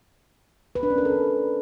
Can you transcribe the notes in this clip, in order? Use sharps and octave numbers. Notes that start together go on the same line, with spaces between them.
B4
D4
C#4
A#4
A4